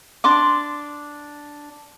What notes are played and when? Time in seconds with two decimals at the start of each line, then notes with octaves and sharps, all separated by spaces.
0.24 D4 C6 D6